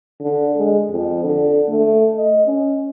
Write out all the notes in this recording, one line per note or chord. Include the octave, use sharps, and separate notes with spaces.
D3
G#3
F2
D3
A3
D#5
C#4